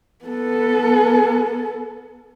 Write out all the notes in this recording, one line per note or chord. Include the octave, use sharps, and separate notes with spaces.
B3 A4